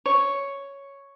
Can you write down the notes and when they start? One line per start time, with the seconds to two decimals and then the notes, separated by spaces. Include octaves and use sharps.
0.06 C#5